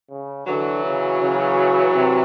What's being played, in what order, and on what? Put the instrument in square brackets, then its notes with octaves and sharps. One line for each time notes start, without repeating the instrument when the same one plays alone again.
[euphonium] C#3
[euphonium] D3 [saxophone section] E3 F#3
[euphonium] C#3
C#3
C3